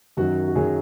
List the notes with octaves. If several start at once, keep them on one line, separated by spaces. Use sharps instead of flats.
F#2 D#3 F#3 F#4
F#4
F#2 D#3 F#3 G#4